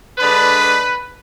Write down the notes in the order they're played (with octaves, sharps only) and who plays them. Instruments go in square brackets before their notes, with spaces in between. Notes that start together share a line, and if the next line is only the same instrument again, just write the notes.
[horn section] D3 G#3 D4 B4